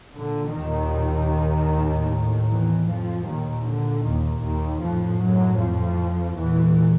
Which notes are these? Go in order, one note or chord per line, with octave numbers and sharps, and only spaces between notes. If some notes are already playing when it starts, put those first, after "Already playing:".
A#2 D3
D#2 D#3
A2
E2 E3
F2 F3
D#2 A#2 D#3
D3
D#2 D#3
D#2 D#3
F2 A2 F3
F#2 F#3
F2 F3
E2 A#2 E3